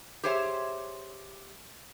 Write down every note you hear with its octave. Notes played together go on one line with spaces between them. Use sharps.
G4 G#4 C5 C#5 E5